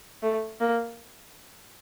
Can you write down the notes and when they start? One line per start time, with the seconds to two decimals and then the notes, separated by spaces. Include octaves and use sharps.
0.23 A3
0.60 A#3